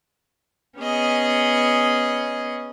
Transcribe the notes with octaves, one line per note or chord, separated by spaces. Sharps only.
B3 C#4 G#4 D#5